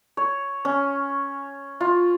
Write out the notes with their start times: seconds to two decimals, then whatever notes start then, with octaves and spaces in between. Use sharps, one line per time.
0.17 C#5
0.65 C#4
1.81 F4